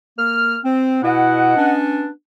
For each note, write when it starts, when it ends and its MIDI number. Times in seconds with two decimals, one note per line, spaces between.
0.18 0.58 58
0.18 0.58 89
0.64 1.02 60
1.03 1.54 47
1.03 1.54 64
1.03 1.76 75
1.03 1.76 78
1.56 2.07 59
1.56 2.07 61
1.56 2.07 62